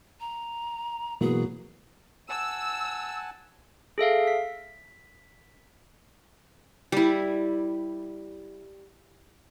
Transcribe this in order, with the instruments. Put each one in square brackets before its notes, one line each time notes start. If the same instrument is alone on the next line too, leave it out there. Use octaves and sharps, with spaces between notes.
[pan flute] A#5
[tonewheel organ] B2 E3 A#3 [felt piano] F#3 B3 F#4 [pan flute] G#4
[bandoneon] F#5 G#5 A5 [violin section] E6
[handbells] G#4 A4 E5 F5
B6
[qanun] G3 E4